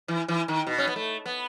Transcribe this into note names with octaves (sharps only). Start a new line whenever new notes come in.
E3
E3
D#3
B2
C#4
B3
A3
B3